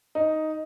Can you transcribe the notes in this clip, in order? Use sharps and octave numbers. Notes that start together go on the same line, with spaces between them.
D#4